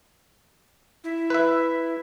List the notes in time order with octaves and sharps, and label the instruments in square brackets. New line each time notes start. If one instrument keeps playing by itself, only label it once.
[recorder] E4
[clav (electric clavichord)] B4 E5